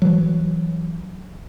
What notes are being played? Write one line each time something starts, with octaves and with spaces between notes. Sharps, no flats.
E3 F#3